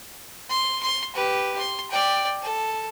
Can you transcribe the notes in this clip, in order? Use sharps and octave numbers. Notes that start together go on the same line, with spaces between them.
C6
C6
G4 B4
C6
D5 G5
A4